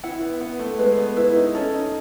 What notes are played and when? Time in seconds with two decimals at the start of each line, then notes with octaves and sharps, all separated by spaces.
0.03 E4 F#5
0.22 B3
0.41 B3 F#5
0.59 A3
0.78 G#3 B4
0.98 B3
1.17 E4 B4
1.30 E4
1.36 D#4
1.55 C#4 A4
1.74 D#4